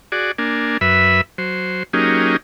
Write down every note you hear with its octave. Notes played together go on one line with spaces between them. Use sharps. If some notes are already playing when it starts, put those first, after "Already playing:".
F#4 G#4 D5
A#3 D4 G#5
F#2 B4 E5 B5
F#3 C5
F#3 A#3 C#4 D#4 G4 G#4